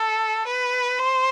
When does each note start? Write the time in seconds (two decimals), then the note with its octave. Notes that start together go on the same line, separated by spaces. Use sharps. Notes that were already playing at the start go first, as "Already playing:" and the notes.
Already playing: A4
0.47 B4
0.99 C5